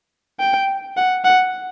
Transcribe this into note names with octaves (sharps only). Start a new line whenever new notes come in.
G5
F#5
F#5